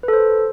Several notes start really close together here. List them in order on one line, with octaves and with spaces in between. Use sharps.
B4 A4 C5